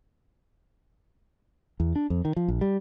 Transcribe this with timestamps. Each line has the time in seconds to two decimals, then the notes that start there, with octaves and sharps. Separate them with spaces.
1.80 E2
1.96 D4
2.10 F2
2.25 D#3
2.36 F3
2.48 A#1
2.61 G3